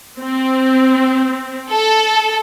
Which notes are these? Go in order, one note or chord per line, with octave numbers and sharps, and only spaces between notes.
C4
A4